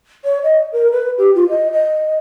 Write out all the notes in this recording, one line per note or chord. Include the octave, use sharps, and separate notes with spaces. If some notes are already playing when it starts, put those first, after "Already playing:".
C#5
D#5
A#4
B4
G4
F4
D#5
D#5